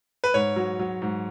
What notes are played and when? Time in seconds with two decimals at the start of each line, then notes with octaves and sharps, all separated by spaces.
0.24 B4
0.34 G#2 C#5
0.56 F#3
0.80 F#3
1.02 G#2